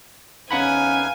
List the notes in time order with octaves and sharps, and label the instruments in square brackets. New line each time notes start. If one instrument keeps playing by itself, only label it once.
[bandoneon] E2 D#4 B4 [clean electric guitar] C#4 F#5 B5 [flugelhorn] F5 [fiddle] G#5